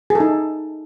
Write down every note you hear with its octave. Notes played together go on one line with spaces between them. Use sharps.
D#4 G#4 A4